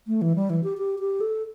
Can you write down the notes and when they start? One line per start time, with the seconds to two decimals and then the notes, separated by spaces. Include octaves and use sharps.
0.07 A3
0.22 E3
0.36 G3
0.50 E3
0.64 G4
0.78 G4
0.99 G4
1.21 A4